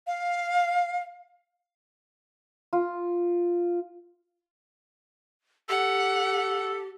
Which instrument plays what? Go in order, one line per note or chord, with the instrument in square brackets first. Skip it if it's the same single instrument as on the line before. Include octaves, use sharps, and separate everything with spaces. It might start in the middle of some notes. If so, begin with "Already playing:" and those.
[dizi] F5
[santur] F4
[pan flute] G4 [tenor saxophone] A4 [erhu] F#5